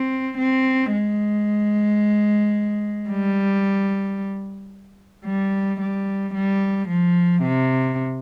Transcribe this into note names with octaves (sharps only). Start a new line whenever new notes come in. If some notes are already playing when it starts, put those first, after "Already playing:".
Already playing: C4
C4
G#3
G3
G3
G3
G3
F3
C3